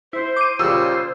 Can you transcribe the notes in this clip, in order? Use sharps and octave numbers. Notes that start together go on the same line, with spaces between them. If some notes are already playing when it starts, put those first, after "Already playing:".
E4 C5
D6 D#7
A#2 C#3 G3 C5 E6